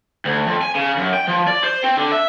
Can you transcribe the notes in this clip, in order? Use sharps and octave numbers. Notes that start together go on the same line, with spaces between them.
D2
F2
G#5
C#3
F#2
G5
F3
D5
C5
C4
D3
E5